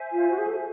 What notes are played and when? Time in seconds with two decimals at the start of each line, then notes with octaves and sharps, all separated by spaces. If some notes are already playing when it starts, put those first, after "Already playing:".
Already playing: C5 E5 G#5
0.13 F4
0.30 F#4
0.38 G#4
0.47 A4